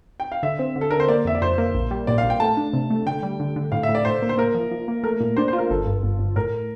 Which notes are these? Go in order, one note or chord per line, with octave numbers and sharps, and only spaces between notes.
G5
F5
D3 E5
C4
D3
A4
D3 A#4
C5
A#3 D5
F2 E5
D5
F2 C5
A#3
A#1
G3
A#2 D5
F5
A#1
G5
A3 A5
D4
C3
A3
D3 G5
G3
D3
D3
A2 F5
E5
A2
D5
A2 C5
A#3
C5
A#3 A#4
F3
F3
A#3
A3 A#4
A#2
D4 C5
C5
F4
A#4
G1 A4
G2
G1
G1
A2 A#4